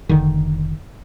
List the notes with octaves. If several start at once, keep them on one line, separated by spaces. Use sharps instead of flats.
F1 D3 D#3